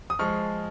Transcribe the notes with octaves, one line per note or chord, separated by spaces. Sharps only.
D#6
F3 G#3 C#6 F6